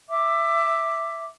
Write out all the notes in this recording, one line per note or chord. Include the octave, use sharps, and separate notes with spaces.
E5 D6